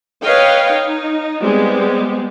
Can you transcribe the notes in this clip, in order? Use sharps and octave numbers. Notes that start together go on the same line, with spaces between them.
B4 C#5 D#5 F5 G5
D#4
G3 G#3 B3 C4